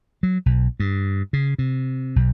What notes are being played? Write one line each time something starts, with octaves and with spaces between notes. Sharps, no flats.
F#3
B1
G2
C#3
C3
B1